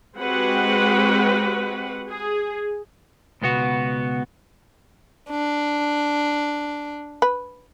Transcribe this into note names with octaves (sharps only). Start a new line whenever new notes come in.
G#3 C4 F#4 G4 B4 F#5
G#4
C#2 B2 B3 F#4
D4
B4